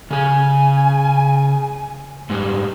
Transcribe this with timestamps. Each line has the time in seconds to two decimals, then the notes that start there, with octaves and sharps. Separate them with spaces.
0.11 C#3 G#4 G#5
2.30 G#2 G3